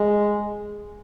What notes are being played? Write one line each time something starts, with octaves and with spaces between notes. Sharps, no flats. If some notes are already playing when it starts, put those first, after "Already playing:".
Already playing: G#3